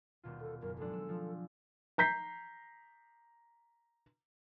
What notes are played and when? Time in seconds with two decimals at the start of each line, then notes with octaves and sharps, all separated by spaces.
0.23 D#1 B2 F4
0.41 A4
0.62 F#1 A#4
0.78 F3 G#3 D4 A4
0.93 E6
1.09 F3
1.98 A#5 G6 B6 C7